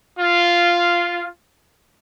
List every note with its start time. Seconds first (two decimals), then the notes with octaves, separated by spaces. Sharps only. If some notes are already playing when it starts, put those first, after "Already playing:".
0.19 F4